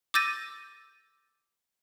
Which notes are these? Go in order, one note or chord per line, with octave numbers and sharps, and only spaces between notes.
D6 E6 G6 A6 A#6 D#7